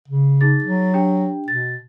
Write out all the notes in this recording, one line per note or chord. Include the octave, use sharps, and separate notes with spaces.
C#3
D#4 G#4 A6
F#3
D4 G4 G5
B2 A6